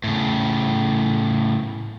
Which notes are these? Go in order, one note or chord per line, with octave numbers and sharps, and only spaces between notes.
A2 C#3